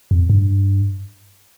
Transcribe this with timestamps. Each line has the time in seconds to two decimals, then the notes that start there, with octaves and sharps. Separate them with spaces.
0.11 F2
0.30 G2